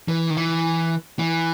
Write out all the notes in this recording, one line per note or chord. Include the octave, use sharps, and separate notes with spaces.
E3
D#3
E3
E3